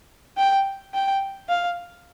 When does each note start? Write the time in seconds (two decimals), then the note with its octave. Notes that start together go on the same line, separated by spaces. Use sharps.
0.37 G5
0.94 G5
1.49 F5